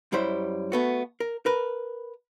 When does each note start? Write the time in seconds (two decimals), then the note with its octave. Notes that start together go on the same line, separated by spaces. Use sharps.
0.12 F#2 G3 E4 C5
0.72 A3 B3 F#4
1.20 A#4
1.46 A#4 B4